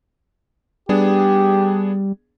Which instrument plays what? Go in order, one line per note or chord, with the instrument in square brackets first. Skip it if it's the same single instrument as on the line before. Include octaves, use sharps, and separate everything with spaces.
[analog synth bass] G3 [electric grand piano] B3 D4 G#4 [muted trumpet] G4